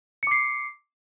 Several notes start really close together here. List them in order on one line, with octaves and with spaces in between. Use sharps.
C#7 D6 C7